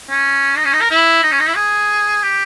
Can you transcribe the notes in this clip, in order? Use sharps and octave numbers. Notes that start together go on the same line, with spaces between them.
C#4
D#4
C#4
D#4
A#4
E4
D#4
C#4
D#4
E4
G#4
G4